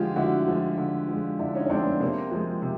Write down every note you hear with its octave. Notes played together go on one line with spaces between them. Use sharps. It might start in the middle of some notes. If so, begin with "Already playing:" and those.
Already playing: D3 F3 G#3 F4 G4
D3 E4 F#4
F3 G#3
D3
F3 G#3
D3 D4 E4
C#4 D#4
C#4
F3 G#3 C4 D4
B3
C3 A#3 C4
F3 G#3
C3